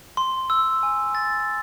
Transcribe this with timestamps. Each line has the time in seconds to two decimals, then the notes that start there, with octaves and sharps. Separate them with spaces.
0.17 C6
0.50 E6
0.83 G#5
1.15 A6